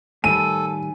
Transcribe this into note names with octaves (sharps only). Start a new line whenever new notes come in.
A2 D#3 G3 A4 G#5 D#7